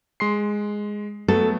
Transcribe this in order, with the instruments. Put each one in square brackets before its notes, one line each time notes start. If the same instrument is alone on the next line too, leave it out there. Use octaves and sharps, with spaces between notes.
[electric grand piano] G#3 C6 C7
[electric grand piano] F#3 A3 B3 [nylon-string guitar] A4